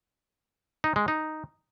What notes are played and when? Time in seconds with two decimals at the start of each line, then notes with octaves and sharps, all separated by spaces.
0.84 D#4
0.96 G#3
1.08 D#4